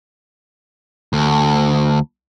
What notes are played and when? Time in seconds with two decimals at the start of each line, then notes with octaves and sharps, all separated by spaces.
1.13 D2